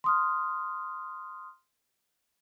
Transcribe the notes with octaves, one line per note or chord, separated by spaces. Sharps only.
C6 D#6 F6